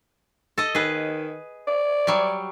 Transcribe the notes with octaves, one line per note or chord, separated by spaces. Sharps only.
A4 D#5
D#3 G#4 B4
D5
F#3 G3